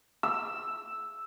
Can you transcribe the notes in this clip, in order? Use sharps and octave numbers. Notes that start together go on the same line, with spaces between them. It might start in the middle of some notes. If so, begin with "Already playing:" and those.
E6